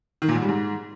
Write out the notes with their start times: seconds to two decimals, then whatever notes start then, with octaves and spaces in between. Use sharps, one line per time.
0.22 D#3
0.29 A#2
0.35 G#2
0.42 G3
0.49 G#2